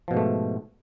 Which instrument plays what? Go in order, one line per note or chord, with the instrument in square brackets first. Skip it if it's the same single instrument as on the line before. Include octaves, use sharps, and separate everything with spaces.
[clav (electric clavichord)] F3
B2
G#2
A3